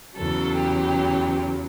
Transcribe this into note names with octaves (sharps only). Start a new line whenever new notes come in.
E2 C#3 F#3 A4
G4